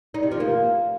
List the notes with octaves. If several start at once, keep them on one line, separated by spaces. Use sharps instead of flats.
D#4
C3
F3
A#3